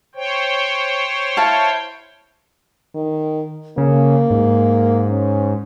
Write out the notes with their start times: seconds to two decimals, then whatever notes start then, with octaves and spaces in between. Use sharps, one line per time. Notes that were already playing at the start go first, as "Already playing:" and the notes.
0.15 C5 C#5 G5
1.37 E4 F5 A5
2.95 D#3
3.78 C#3 A#3
4.30 G#2
5.09 C#4